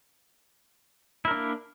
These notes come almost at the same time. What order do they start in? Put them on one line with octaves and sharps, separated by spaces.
E4 A#4 D4 A#3